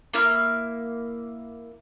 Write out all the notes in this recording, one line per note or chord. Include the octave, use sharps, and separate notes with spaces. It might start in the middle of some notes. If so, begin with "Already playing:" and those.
A#3 E4 F6